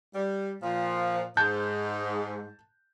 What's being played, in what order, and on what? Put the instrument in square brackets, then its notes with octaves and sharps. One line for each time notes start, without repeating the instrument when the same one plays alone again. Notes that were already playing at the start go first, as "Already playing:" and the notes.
[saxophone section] G3
A#2 F3
[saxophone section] G#2 [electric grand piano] A5 F#6 G6